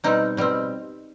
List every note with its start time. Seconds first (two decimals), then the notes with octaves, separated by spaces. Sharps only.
0.04 B2 G3 C4 D#4
0.37 B2 G3 C4